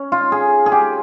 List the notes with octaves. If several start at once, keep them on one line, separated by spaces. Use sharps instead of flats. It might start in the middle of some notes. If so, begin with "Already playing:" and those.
Already playing: C#4
F4
G#4
G#4
G4